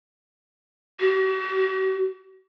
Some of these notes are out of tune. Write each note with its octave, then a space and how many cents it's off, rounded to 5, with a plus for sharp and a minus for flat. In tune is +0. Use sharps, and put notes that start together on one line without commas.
F#4 +45